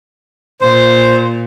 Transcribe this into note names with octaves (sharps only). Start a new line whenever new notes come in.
A#2 C5